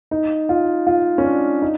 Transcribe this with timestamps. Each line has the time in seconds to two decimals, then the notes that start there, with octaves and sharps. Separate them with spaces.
0.11 D#4
0.49 F4
0.87 F4
1.18 C#4
1.24 D4
1.62 D#4